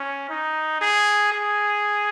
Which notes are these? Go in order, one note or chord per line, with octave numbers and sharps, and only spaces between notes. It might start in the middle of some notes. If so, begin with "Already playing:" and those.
Already playing: C#4
D#4
G#4
G#4